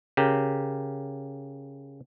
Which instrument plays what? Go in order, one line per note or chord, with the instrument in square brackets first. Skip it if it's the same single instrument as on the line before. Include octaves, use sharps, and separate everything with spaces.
[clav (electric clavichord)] C#3 G4 A#4